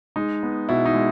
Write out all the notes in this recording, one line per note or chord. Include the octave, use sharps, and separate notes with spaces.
G#3 D#4
B3
B2 E4
D#4
G#3